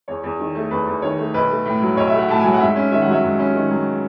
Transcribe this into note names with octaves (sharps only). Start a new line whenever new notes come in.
E2 C#5
E2
D#3
A3
E2 B4
E2
D#3 C#5
A3
B1 B4
A3
A2
F#3
B1 C#5
E5
A3
F#5
A2 A5
F#3 G#5
F#5
G#2 E5
C#4
D#3 E5
F#5
F#3 E5
G#2
C#4
D#3
F#3